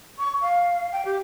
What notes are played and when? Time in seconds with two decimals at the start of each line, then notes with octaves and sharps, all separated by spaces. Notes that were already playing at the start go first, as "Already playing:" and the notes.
0.19 C#6
0.42 F5
0.92 G5
1.05 G4